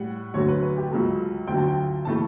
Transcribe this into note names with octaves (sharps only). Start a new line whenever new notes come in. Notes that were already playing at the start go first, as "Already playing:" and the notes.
Already playing: A2 G3 F#5
D2 D3 F#3 A3 C#5
B4
B4
G4
C#2 C#3 F#3 A4
D2 D3 F#3 G5
A5
G5
C#3 E3 A3 A5